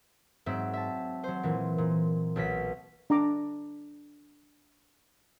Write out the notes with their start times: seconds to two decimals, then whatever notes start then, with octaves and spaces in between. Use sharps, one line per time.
0.46 G#2 F#3 C4 E5
0.73 E5 A5
1.24 F#3 C5
1.43 A#2 E3
1.78 A#2
2.36 B1 B2 F#3 B6
3.10 D4 A#5 D6